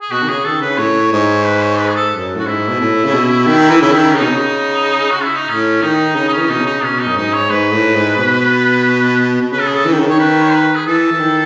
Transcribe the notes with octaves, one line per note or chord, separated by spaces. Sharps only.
G#4
B2 F#4
D#3
C#3 G#4
D#3 A4
C#3 B4
A2 C#5
G#2 C#5
B4
B4
C#5
B4
G#4
A4
F#2
A2 F#4
G#2 E4
B2
A2
C#3
B2
D#3
E3
C#3
D#3
C#4
C#3 D#4
B2
C#3
F#4
E4
D#4
A2 C#4
D#3 D#4
C#3 D#4
D#4
E3 C#4
B2 D#4
C#3
D#4
B2 C#4
D#4
F#2
G#2 D#4
C#5
G#2 B4
A2
G#2
B2
B2
C#3 B4
A4
G#4
A4
E3
D#3
C#3
D#3 C#5
B4
C#5
B4
G#4
E3 A4
E3
D#3